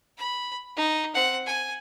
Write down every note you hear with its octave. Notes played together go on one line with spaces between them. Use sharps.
B5
D#4
C4 F#5
G#5